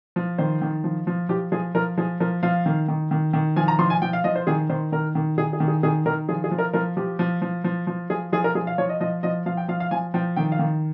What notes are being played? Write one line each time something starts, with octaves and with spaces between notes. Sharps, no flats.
F3
D#3 C5
D#3
F3
F3
F3 G4
F3 G#4
F3 A#4
F3 G#4
F3 A#4
F3 F5
D#3
D#3
D#3
D#3
F3 G#5
A#5
F3 C6
G#5
F3 G5
F5
F3 D#5
C5
D#3 G#4
D#3 C5
D#3 A#4
D#3
D#3 G#4
G#4
D#3
G#4
D#3 G#4
D#3 A#4
F3 G#4
G#4
F3
A#4
F3 A#4
F3 G4
F3
F3
F3
F3
F3 G#4
F3 G#4
A#4
F3 G#4
F5
F3 C#5
D#5
F3 D#5
F3 D#5
F3 F5
G5
F3 F5
F5
F3 G#5
F3 G5
D#3 G5
F5
D#3